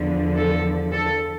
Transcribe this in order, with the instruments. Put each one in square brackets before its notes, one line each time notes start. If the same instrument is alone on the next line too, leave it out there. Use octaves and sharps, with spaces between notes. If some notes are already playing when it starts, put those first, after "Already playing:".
Already playing: [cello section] E2 D3 F3
A4
A4